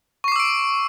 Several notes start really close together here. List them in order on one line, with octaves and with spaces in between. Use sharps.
C#6 C7 D6 E6 D7